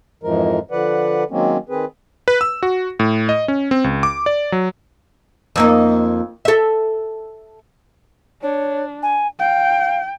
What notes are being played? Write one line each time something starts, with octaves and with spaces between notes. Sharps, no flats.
F2 G#2 E3 F3 G#3 A#4
D3 F3 B4 D5 F#5
D#3 F#3 G#3 A#3 C4 C#4
D#3 C4 G#4 B4
B4
E6
F#4
A2
D#5
C#4
C4
C#2
D6
D5
F#3
F2 A#3 D#4
A4 E5
D4 C#5
G#5
F5 G5